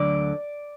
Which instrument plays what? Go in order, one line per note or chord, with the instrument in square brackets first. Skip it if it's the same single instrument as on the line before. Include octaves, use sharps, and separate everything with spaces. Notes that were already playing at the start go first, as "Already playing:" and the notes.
Already playing: [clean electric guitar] D2 D3 F#3 D5